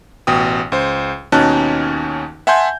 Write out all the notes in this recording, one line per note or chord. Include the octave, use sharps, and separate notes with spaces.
A1 B2 G5 D#6
C#2 C5
D#2 B2 C#4 D#4 A5 F#6
E5 F#5 G#5 A5 C6 G6